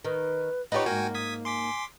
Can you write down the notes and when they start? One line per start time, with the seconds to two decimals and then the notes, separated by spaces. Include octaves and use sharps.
0.05 D#3 B4
0.72 D#4 F4 G4 B4 C#5 F#5
0.86 G#2 A#3 F#4 G5 G#5
1.15 D#6 G#6 B6
1.45 G#5 C6 D6 B6